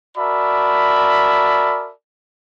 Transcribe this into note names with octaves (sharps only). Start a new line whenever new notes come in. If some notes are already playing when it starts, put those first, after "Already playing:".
F#4 A#4 D5 E5 A5 B5